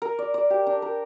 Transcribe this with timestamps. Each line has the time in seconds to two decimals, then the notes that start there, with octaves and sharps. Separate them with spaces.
0.02 A#4
0.19 D5
0.34 D5
0.50 G4
0.67 D4
0.82 A#4